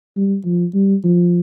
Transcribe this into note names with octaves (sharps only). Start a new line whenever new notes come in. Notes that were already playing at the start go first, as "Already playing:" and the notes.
G3
F3
G3
F3